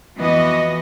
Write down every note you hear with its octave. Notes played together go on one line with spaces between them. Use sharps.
F2 E3 B3 F#4 D#5